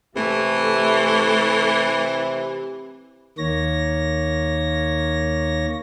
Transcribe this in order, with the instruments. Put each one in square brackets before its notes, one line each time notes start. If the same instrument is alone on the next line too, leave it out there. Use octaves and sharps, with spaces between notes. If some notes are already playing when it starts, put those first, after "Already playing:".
[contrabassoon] C3 [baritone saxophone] E3 [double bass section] A3
[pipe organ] D#2 D#3 A#3 C#5 A#6